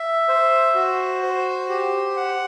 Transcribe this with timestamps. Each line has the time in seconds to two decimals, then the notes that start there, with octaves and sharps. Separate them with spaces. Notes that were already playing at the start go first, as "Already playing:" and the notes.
Already playing: E5
0.28 C5
0.74 F#4
1.23 C5
1.69 G4
2.16 F#5